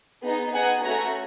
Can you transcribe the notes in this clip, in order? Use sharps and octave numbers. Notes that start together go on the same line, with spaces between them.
B3 D#4 G#4
B3 D#4 G#4 F#5 G#5
A3 C#4 F#4 G#5 A#5